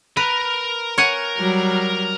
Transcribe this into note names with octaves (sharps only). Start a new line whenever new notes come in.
A#4 B4 A#5
C#5 F#5 G#5
F#3 G3